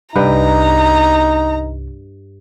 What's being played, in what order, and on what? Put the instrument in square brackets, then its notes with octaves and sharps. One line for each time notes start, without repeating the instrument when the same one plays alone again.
[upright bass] C2 [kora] G2 B4 G5 [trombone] D#4 [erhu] A#5